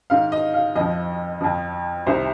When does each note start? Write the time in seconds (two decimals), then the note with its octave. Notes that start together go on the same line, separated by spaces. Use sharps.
0.10 G#2 D#3 F5
0.32 D#5
0.54 F5
0.76 F2 F3 D#5
1.41 F2 F3
2.06 C2 C3 D#3 C5